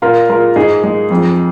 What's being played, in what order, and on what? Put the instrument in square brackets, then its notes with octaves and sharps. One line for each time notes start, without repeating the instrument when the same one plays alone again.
[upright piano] A#2 F4 A#4
G#3 F4 A#4
G#2 D#4 G#4
G#3
F2